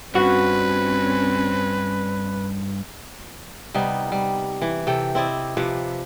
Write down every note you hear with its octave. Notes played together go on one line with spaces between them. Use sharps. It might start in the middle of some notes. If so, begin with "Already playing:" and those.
G2 C4 C#4 F#4 B4
C3 G3 B3 D#4
G3
E3
C3 A4 G5
C4 E4 D5 D#5
C3 F3 B4